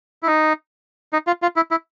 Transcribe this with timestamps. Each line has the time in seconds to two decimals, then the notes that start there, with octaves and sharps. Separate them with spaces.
0.23 E4
0.27 D#4
1.13 D#4
1.27 F4
1.42 F4
1.56 E4
1.71 E4